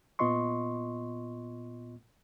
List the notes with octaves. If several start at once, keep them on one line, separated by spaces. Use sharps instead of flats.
A#2 B3 F4 D#5 C6 C#6